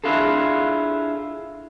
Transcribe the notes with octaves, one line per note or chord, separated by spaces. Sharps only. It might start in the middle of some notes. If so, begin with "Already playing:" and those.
D4 E4 F4 G#4 A4